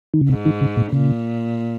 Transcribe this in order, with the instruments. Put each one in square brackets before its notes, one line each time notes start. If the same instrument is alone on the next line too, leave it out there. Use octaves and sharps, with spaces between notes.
[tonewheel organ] D#3
C#3
[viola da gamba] G#2 [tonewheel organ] C3
[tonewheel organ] D#3
C#3
A#2
[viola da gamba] A#2 [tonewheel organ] C#3